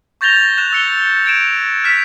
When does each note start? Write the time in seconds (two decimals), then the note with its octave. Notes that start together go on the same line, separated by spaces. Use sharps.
0.21 C#6 G6 A6 A#6 F7 G7
0.58 F#6 A6 E7
0.72 E6 C#7 G7
1.26 G#6 D7 E7
1.84 F6 B6 E7